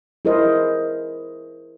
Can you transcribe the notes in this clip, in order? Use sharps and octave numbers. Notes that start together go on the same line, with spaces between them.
E4 G#4 A#4 C5 D#5